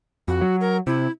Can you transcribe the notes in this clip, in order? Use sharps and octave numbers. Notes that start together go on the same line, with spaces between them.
F2 F#4
F#3
A#4
C3 E4